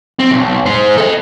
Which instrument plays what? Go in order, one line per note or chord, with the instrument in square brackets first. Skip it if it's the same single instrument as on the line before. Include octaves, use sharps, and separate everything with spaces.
[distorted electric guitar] C4
B1
G#3 C5
A4 D#5